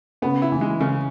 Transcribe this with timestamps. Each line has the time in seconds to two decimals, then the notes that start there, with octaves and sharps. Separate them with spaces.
0.22 C#3 B3
0.42 E4
0.52 E3
0.61 G#3
0.80 C#3